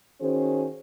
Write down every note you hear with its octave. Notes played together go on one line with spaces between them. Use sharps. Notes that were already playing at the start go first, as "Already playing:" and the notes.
D#3 C#4 F#4 G#4 C5